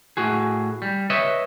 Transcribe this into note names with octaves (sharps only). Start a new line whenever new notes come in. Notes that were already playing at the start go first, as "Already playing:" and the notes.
A2 F#4 G#4
G3
B4 C#5 D#5 E5